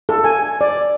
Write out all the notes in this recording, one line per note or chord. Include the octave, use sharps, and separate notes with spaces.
A4
G#5
D5